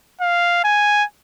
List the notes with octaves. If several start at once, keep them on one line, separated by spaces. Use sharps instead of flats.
F5
G#5